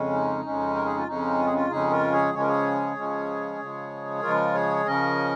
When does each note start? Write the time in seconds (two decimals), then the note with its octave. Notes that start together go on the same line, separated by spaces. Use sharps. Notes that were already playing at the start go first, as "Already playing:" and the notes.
Already playing: F2 C#3 G#3 C#4
0.13 D#4
0.45 F2 C#3 G#3 C#4
0.75 A#4
0.86 G#4
0.97 F4
1.07 F2 C#3 G#3 C#4 D#4
1.38 F4
1.46 G#4
1.53 C#4 F4
1.70 F2 C#3 G#3 C#4 D#4 G#4
1.91 F4 A#4
2.12 G#4 C#5
2.33 C#3 F3 G#3 C#4 C#5
2.41 A#4
2.47 G#4 C#5
2.96 C#3 F3 G#3 C#4
3.59 C#3 F3 G#3
4.22 C#3 F3 G#3 F4 A#4
4.54 G#4 C#5
4.86 C#3 F3 C#4 A#4 D#5